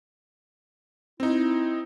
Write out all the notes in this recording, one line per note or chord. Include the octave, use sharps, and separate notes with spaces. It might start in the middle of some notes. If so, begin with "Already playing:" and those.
C4 D#4 E4